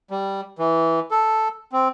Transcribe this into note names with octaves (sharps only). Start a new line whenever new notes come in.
G3
E3
A4
C4